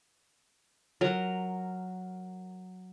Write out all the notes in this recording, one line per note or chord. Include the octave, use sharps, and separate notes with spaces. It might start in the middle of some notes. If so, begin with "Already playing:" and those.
F#3 A#4 A#5